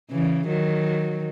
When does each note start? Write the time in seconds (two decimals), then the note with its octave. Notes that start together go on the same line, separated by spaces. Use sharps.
0.11 C#3 E3
0.47 D#3 F#3